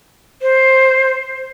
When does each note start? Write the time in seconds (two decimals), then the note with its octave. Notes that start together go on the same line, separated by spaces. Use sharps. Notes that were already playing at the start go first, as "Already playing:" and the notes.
0.42 C5